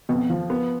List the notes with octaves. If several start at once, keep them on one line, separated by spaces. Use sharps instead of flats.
F2 B2
F3
B3